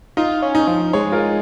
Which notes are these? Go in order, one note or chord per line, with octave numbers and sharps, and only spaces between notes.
D#4 F4
C#4
D#4
F3
G#3 G#4 C#5
F4 A#4